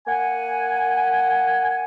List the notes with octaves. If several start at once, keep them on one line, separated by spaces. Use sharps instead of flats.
A#3 F#5 G#5